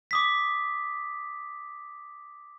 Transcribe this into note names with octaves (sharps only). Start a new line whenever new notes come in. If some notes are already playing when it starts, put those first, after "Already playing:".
D6 D#6 B6